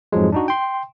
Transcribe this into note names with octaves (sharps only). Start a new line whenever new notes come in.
F2 G#2 F3 F#3 G#3
D4 D#4 F#4
G5 C6